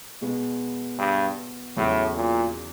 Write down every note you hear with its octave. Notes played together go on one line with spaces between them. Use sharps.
B2 G#3 B3
G2
E2 A2 C#3 F#3
A#2